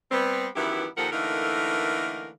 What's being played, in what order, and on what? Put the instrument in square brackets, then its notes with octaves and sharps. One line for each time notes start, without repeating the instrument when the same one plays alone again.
[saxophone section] G3 B3 C4
F#2 D#3 E3 B3 E4 G4
D#2 A#2 F3 A4 A#4 F#5
D3 E3 A3 A#3 D#4 A#4